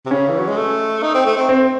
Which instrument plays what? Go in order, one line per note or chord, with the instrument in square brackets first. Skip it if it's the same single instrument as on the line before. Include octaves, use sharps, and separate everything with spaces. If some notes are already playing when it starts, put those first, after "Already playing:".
[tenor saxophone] C3
[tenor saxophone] C#3 [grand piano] C#4
[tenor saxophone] E3
F#3
G#3
A3
D#4
C4
A3
C4
[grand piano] C4